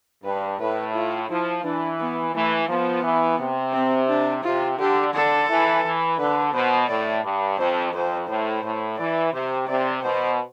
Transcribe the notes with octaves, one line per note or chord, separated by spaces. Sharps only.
G2 B4
A2 B4
F4
F3 E4
E3 D4
B3
E3 A3
F3 B3
E3
C3
C4
D4
C3 F4
D3 G4
D3 A4
E3
E3
D3 B4
B2 C5
A2 D5
G2
F2 C5
F2 C5
A2 C5
A2
E3 D5
C3 C5
C3 D5
B2 C5